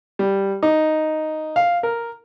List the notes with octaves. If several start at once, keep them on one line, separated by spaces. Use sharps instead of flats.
G3
D#4
F5
A#4